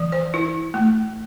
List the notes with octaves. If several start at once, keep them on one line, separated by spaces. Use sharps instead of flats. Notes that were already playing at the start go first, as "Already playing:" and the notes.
Already playing: E3
C5
E4
A3